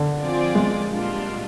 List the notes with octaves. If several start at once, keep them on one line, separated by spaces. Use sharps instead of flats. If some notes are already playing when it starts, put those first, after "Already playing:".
Already playing: D3
F3 C4 F4 G#4 D5
G#3
A#2 G3 D4 F4